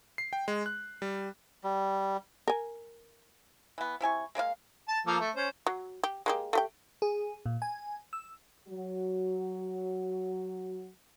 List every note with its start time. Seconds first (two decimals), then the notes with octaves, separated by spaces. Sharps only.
0.18 C7
0.33 G5
0.48 G#3
0.66 F#6
1.02 G3
1.64 G3
2.48 A#4 G#5
3.78 E3 B3
4.01 C3 E4 G#5 C#6
4.35 G#3 A#3 D5 F5
4.88 A5
5.06 F3 A#3 A4
5.20 A3
5.35 C#4 C5
5.66 F#3
6.03 G4
6.26 G#3 A#3 G4
6.53 A3 G4 G5
7.02 G#4
7.46 A#2
7.62 G#5
8.13 E6
8.69 F#3 F#4